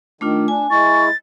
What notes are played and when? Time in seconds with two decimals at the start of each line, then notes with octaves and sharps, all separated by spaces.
0.21 D#3 A3 D4 F4
0.48 D4 G#5
0.71 G#3 E4 C#6 A6